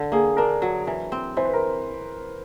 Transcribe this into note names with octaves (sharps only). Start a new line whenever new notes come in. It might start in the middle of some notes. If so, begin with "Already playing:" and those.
Already playing: D3
A#3 G#4
D4 A#4
F#3
E3
C4
E3 C5
B4
A#4